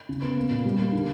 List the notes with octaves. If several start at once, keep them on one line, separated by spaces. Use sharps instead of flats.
C#3
B3
A#3
A#2
G3
A#3
D3